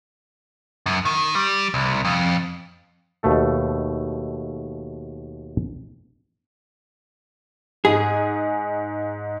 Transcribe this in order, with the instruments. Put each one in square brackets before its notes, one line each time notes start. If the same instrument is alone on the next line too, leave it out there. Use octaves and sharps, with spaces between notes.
[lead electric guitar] F#2
D#3
G3
C2
F2
[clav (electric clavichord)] D#2 B2 A3 A4
[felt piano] G#2 [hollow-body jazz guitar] G#4